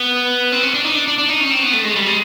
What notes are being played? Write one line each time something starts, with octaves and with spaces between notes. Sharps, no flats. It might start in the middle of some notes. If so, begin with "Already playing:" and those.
Already playing: B3
C4
C#4
D4
D#4
D4
D4
D4
D#4
C#4
C4
B3
A3
G#3
G3
G#3